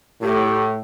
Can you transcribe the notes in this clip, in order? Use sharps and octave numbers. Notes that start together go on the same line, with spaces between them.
A2 G4